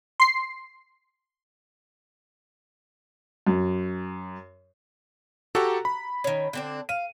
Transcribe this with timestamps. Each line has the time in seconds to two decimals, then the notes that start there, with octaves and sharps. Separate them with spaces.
0.20 C6 C7
3.47 F#2
5.55 F#4 G4 A4 F#5 A#5
5.85 B5
6.24 D#3 C#4
6.53 D3 C4 D4
6.89 F5 D#7